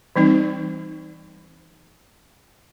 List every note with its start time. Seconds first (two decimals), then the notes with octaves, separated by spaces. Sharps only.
0.16 E3 G3 C4 D#4